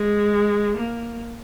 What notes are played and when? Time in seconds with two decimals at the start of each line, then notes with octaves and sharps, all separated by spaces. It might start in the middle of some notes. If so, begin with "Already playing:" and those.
Already playing: G#3
0.77 A#3